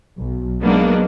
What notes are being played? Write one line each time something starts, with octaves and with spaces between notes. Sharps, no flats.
B1
F#3 G#3 A#3 B3 D4 D#4